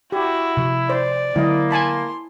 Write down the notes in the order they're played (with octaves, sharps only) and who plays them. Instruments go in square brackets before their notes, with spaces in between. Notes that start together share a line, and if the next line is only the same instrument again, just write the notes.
[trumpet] E4 [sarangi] F#4 [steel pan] G4
[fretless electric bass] C3 F3
[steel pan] C5 [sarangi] D5
[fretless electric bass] D3 F#3 G#3 [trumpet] A#3 [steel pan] E4 D#5
[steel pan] G#5 A5 B5 [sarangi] C6